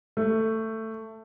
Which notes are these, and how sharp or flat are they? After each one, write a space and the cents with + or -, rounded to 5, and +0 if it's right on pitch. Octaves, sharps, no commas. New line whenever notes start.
A3 +15